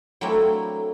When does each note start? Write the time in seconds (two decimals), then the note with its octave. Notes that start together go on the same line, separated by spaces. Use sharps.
0.21 F#3 A3 A#3 C4 D4 E4